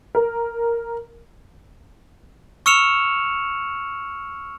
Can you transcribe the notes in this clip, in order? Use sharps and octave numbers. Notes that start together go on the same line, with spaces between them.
A#4
C#6 E6 F6 C#7 E7 F7